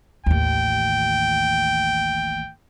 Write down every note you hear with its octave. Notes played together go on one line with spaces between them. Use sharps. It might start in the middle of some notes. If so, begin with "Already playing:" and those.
A1 D#2 G5